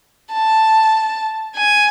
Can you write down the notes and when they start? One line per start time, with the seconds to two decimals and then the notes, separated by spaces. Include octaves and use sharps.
0.33 A5
1.57 G#5